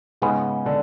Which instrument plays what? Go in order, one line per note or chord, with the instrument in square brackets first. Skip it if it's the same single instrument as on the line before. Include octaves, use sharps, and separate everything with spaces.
[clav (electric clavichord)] G#2 G#3 B3 [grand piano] C#3 C#4
[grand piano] D3 D4